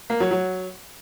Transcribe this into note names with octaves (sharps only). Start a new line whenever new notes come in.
A#3
F#3
F#3